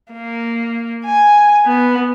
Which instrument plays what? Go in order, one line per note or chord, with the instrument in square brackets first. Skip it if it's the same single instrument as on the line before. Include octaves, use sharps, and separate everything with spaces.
[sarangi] A#3
G#5
B3